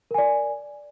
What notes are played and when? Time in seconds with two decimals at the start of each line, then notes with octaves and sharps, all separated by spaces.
0.11 A#4
0.14 G#5
0.18 D5